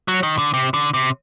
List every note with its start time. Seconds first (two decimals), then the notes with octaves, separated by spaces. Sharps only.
0.08 F#3
0.23 D#3
0.38 D3
0.54 C3
0.74 D3
0.94 C3